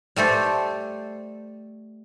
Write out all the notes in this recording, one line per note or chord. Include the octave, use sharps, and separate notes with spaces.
G3 A3 A4 C5